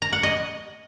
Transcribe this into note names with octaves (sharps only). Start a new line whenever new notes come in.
A#5
F#5
D#5